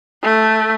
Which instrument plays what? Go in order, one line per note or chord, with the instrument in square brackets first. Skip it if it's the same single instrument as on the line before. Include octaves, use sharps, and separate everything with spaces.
[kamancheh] A3